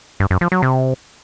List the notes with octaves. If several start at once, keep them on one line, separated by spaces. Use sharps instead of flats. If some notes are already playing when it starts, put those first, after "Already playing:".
G2
F#2
F3
F#3
C3